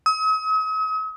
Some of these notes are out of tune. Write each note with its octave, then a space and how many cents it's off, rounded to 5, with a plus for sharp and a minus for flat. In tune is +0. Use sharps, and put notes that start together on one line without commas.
D#6 +45